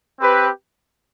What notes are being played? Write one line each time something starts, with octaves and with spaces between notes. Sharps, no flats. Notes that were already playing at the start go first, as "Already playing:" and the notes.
C4 G4 B4